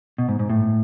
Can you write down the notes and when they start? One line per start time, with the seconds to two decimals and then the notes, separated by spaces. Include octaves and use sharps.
0.18 B2
0.29 G#2
0.39 G#2
0.49 A2